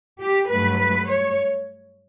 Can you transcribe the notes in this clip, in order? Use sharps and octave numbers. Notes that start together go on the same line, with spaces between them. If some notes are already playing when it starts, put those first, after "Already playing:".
G4
G2 F#3 A3 B4
B4
C#5